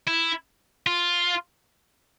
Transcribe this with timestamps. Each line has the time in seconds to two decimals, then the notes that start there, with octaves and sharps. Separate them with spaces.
0.08 E4
0.87 F4